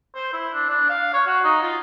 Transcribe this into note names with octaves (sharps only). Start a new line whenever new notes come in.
C5
E4
D4
D4
F5
C#5
F#4
D#4
F4